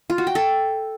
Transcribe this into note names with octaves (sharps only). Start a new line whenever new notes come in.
F4
F#4
G5
A4